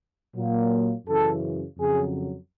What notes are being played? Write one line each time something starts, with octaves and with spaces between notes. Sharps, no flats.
A#2 F#3 A#3
F#2 C#3 E3 A4
F2 C#3 F#3 G#4